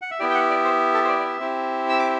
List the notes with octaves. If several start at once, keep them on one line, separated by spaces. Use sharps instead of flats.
F#5
E5
B3 E4 G4 D5
G5
F#5
D5
C5
A4
C5
D5
D5
E5
C4 E4 G4
E6
D6